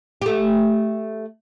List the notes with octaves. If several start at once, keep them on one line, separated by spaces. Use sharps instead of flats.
A3 G4